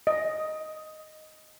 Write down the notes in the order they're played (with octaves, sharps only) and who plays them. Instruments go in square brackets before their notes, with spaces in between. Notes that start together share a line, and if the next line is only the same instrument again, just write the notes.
[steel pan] D#5